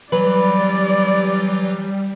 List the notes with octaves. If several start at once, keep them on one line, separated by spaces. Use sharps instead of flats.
E3 F#3 G3 B4 D5